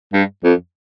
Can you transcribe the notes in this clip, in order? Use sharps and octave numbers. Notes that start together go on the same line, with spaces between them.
G2
F2